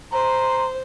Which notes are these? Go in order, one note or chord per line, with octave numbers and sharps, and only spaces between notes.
C5 A#5 C6